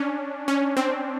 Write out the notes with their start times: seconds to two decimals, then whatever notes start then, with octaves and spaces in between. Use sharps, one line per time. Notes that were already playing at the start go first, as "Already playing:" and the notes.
Already playing: C#4 D4
0.48 C#4
0.77 C4